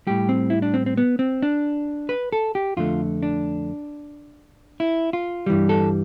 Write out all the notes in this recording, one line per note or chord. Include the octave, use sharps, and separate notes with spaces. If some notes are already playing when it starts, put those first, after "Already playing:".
A2 G3 G4
C4
E4
D4
C4
C4
B3
C4
D4
B4
A4
G4
F2 D3 A3 F4
D4
E4
F4
G2 E3 G3
A4